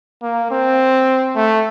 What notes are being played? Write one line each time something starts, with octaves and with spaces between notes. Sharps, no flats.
A#3
C4
A3